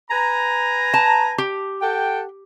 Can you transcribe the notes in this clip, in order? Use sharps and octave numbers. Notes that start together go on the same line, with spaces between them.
B4 G#5 A#5
A5
G4
A4 F#5 G5